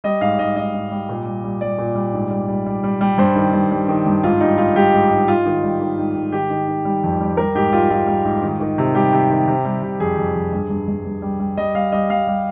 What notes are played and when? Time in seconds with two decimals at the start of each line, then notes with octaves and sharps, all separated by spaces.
0.04 G3 D#5
0.21 G#2 F5
0.39 G#2 D#5
0.56 G#2 D#5
0.74 G#2
0.91 G3
1.09 A#2
1.26 G3
1.44 G3
1.61 G3 D5
1.78 A#2
1.96 G3
2.13 G#2
2.31 G3
2.48 G3
2.66 G3
2.84 G3
3.01 G3
3.18 G2 C5
3.35 D#3
3.53 G2
3.71 G3
3.88 D#3
4.06 G2
4.23 G#2 F4
4.41 G3 D#4
4.58 G#2 F4
4.75 G3 G4
4.93 G#2
5.11 G#2
5.28 G#2 F4
5.46 D#3
5.63 G3
5.81 D#3
5.98 G#2
6.16 G#2
6.32 D#3 G4
6.50 D#3
6.68 D#3
6.85 G3
7.03 F2
7.21 G3
7.37 G3 A#4
7.55 G#2 G4
7.73 G3 F4
7.90 G#2 F4
8.07 G3
8.25 G#2
8.43 D#3
8.60 D#3
8.78 C3
8.95 G3 G4
9.13 C3
9.30 D#3
9.48 C3
9.65 G3
9.82 C3
10.00 F2 G#4
10.18 F2
10.35 F2
10.52 G2
10.70 G2
10.88 G2
11.05 G2
11.22 G3
11.40 G3
11.57 G3 D#5
11.75 G3 F5
11.92 G3 D#5
12.10 G3 F5
12.27 G3